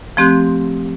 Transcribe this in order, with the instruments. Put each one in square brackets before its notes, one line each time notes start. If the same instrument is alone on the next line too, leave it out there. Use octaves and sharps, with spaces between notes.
[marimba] F3 A3 C4 G4 C6 F#6